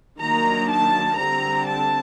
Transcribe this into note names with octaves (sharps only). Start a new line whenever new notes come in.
D#3 F#3 A#3 D4 A#5
A5
D3 G3 C4 A#5
A5